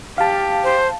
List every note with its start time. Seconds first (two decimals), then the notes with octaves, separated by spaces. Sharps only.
0.18 G4 F5 A5
0.64 C5